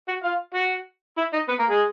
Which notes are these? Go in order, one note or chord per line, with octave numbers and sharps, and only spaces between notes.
F#4 F#5
F4 F5
F#4 F#5
E4 E5
D#4 D#5
B3 B4
A#3 A#4
G#3 G#4